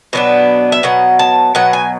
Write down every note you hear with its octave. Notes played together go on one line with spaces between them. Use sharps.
B2 F#3 B3 D4
E5
B2 F#3 F#5
A5
B2 F#3 F#5
G#5